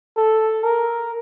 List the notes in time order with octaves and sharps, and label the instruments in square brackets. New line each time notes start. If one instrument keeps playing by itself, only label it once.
[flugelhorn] A4
A#4